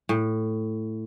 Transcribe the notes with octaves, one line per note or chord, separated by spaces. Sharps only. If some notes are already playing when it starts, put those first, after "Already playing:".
A2